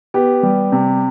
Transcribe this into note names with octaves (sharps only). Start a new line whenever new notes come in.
B3 G4
G3
C3